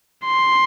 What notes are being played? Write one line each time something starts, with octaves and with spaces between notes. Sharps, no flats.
C6